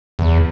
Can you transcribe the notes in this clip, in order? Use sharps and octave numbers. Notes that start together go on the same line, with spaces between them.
E2